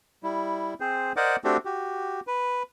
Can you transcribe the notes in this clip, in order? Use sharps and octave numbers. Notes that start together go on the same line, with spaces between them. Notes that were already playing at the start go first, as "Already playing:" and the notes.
G3 E4
C4 G#4 C5
A#4 C5 D5 D#5 F#5 D6
A3 C4 D4 F#4 G4 A4
F#4 G4
B4